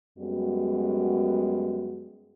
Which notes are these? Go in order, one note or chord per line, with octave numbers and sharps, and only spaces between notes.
F#2 G3 G#3 B3 F#4